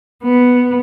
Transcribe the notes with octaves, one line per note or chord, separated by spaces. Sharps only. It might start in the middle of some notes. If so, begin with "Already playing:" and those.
B3